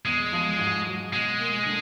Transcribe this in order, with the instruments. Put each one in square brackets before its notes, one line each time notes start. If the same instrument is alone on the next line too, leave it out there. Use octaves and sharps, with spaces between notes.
[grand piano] E2 [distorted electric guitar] G#3
[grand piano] F3
G#2
F#3
[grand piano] B2 [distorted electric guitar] G#3
[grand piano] A#3
D3